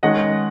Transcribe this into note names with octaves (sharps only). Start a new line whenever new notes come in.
D#3 G#3 C#4 D#5 F#5